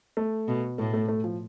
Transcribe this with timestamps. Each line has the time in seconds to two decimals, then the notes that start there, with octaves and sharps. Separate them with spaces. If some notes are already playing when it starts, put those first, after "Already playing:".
0.17 A3
0.48 B2
0.78 A2 A3
0.94 A3
1.09 A3
1.24 F3